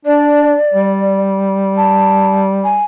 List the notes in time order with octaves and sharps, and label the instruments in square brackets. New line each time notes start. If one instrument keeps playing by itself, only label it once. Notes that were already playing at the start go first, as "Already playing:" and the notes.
[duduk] D4 [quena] D5
[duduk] G3
[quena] A5
G#5